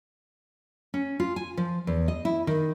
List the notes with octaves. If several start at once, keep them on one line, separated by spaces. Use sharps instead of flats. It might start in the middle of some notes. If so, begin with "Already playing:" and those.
C#4
F4
G#5
F3
E2
D#5
E4
D#3